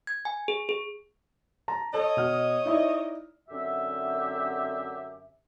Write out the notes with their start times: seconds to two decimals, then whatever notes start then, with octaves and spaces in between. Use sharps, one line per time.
0.07 G#6
0.25 G#5
0.48 G#4
0.69 G#4
1.68 A5 A#5
1.94 A4 C#5 D#5
2.17 B2 F6
2.65 D#4 E4 D5
3.49 F#2 D3 C4 G4 E5